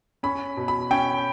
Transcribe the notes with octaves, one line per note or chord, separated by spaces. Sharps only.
C#4 B5
B2
B5
C#4 G5